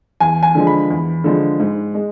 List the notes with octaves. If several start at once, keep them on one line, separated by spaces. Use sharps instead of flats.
E2 G#5
G#5
D3 F3 G#3
B5
E2
D3 F3 G#3
G#2
G#3